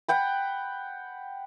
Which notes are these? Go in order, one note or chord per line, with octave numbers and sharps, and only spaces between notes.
F#5 G5 B5